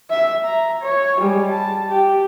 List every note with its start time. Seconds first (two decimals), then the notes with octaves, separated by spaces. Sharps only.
0.10 E5
0.44 A#5
0.82 C#5
1.18 G3 G#3
1.50 A5
1.89 G4